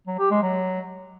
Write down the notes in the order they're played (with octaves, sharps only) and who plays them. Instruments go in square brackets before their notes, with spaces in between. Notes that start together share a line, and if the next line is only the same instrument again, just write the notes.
[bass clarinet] F#3
G4
G#3
F#3